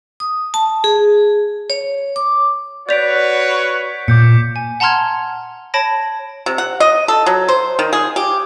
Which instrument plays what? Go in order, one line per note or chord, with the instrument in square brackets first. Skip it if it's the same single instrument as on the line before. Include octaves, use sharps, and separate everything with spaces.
[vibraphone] D#6
A5
G#4
C#5
D6
[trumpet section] F#4 B4 C#5 [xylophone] D5 F7 [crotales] G6 B6 D7
[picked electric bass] A#2 [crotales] D6 G6 C#7
[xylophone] G#5
F#5 A5 A#5 C6 F6 G#6
C#5 A5 B5 A#6 D7
[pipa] C3
F#5
D#5
A4
F#3
C5
D#3
G#4
G4